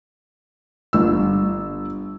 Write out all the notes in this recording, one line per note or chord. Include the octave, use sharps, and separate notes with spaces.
G1 E6